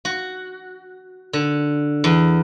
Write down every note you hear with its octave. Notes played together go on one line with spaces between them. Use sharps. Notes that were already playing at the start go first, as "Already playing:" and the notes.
F#4
D3
E2